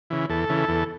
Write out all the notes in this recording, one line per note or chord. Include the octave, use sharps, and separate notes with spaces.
C#3 E3
E2 A4
C#3 E3
E2